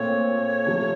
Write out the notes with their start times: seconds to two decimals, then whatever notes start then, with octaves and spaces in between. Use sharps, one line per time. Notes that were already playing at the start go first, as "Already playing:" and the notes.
Already playing: A#2 A3 C4 C#5
0.66 C3 F3 A3